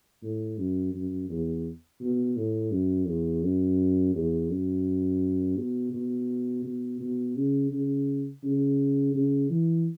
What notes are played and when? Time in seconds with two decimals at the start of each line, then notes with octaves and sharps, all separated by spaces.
0.23 A2
0.58 F#2
0.94 F#2
1.29 E2
2.01 B2
2.37 A2
2.72 F#2
3.07 E2
3.43 F#2
4.15 E2
4.50 F#2
5.58 B2
5.93 B2
6.64 B2
7.00 B2
7.36 C#3
7.71 C#3
8.43 C#3
9.14 C#3
9.50 E3